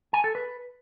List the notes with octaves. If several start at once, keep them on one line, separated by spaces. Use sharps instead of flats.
G#5
A4
B4